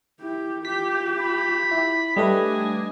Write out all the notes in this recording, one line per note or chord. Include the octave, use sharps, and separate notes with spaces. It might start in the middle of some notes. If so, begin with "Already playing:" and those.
E4 G4
F4 G4 B6
B5
E4
G3 A3 D4 B4 D#5 G#5